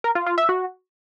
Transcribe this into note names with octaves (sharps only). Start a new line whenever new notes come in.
A#4
F4
F4
E5
F#4